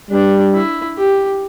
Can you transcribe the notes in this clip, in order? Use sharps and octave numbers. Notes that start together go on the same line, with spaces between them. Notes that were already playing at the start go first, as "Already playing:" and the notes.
G3 D4
E4
G4